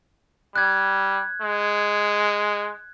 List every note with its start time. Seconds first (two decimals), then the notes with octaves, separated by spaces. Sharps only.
0.56 G3 F#6 G#6
1.42 G#3